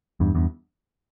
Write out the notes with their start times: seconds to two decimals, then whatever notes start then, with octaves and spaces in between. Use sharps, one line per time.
0.20 E2 G2
0.35 E2 G2